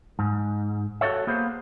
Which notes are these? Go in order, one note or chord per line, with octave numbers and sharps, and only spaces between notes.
G#2
F#4 G4 A4 C#5 E5
A#3 B3 G#4 C5